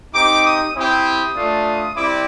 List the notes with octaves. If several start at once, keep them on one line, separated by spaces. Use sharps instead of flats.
C4 D#4 G4 D6
D#6
C4 E4 G4 D#6
A3 D4 F4
G3 C4 E4 D6